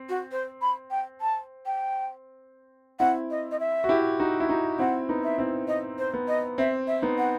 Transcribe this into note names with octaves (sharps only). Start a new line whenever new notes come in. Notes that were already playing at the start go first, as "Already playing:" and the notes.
Already playing: C4
F#4
C5
B5
G5
A5
G5
C4 E4 F#5
D#5
D#5
E5
F#4
E4 G4
D#4 F#4
E4
D#4 F#4
C4 E4 F#5
B3 D#4
E5
C4 E4
D#5
C5
B3
D#5
C4 E5
E5
B3 D#4
F#5